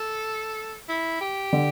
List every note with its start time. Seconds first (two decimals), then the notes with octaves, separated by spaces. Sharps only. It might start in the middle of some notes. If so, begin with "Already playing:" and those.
Already playing: A4
0.89 E4
1.21 G4
1.53 D3